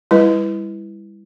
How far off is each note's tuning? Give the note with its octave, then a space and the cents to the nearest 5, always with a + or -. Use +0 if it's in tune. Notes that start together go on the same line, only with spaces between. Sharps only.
G3 +35 E4 +0 B4 +0